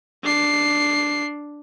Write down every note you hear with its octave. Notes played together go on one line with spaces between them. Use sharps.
D4 C7